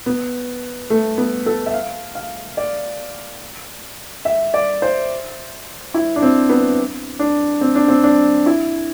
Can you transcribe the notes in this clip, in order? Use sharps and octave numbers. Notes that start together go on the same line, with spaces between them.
B3
A3
B3
A4
E5
F5
F5
D5
E5
D5
C5
E4
D4
C4
B3
D4
C4
D4
C4
D4
E4